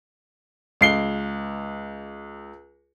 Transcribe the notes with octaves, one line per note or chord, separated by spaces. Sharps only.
C#2 C7 G7